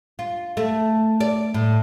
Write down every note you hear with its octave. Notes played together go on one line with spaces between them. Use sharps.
F4
A3
D5
A2